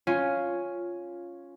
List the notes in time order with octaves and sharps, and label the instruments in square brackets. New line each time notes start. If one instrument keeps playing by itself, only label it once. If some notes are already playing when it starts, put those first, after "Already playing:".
[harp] C#4 F4